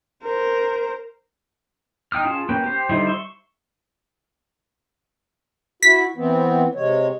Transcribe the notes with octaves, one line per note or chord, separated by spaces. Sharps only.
A#4 C5
D#4 G5 D#6 F6
C#4 F4 G#4 A5
A#3 C#4 B4 G5
G4 C5
D3 G3 D#4 E4 C5
E5 C6 C#6
E4 F#4 B6
E3 B3 C4
C3 G#3 C#5